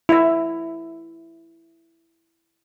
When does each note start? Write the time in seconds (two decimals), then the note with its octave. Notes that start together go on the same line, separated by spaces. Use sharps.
0.09 E4 E5